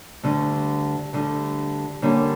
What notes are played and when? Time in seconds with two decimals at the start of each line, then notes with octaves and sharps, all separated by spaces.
0.23 D2 D3 G3
1.13 D2 D3 G3
2.02 D3 G3 A#3 C#4